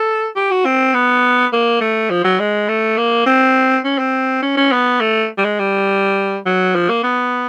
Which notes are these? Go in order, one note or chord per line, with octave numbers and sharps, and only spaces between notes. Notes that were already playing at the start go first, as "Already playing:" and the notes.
Already playing: A4
G4
F#4
C4
B3
A#3
A3
F3
F#3
G#3
A3
A#3
C4
C#4
C4
C#4
C#4
B3
A3
G3
G#3
G3
F#3
F3
A#3
B3